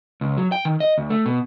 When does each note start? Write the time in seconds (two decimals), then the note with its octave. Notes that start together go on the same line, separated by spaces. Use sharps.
0.21 C#2
0.37 F#3
0.52 G5
0.65 D#3
0.80 D#5
0.98 D2
1.10 A3
1.26 B2